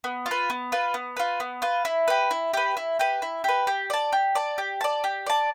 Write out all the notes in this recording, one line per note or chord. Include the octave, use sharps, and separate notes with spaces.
B3
F4
B4
B3
F4 B4
B3
F4 B4
B3
F4 B4
E4
G4 B4
E4
G4 B4
E4
G4 B4
E4
G4 B4
G4
D5 A5
G4
D5 A5
G4
D5 A5
G4
D5 A5